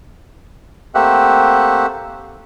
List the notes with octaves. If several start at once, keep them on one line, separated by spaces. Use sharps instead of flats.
A3 A#3 C4 G4 E5 F#5